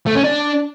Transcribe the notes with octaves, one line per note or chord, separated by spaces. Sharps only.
A3
C#4
D4